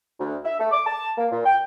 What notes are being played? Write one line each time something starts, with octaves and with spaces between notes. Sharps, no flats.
D2
E5
A3
D6
A5
A#3
A#2
G5